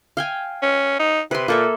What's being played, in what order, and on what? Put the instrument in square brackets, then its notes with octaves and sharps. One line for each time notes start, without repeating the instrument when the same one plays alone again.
[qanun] F5 G5 G#5
[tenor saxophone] C#4
D#4
[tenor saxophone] C3 [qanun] B4 C6
[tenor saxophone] A#2 [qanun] A#3 A4 E5